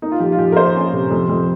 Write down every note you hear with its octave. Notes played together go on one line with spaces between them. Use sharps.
A#3 D#4
F4
F3 G4
F4
F3 G4
A#4
A#3 C5
C#4
C3
F2
F2